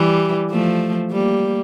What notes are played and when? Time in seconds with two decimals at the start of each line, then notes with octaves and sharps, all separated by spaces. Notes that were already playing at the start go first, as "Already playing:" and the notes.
Already playing: E3 G3
0.52 F3 A3
1.11 G3 A#3